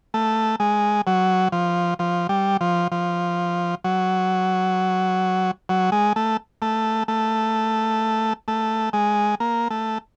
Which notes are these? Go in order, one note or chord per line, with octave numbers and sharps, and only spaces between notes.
A3
G#3
F#3
F3
F3
G3
F3
F3
F#3
F#3
G#3
A3
A3
A3
A3
G#3
A#3
A3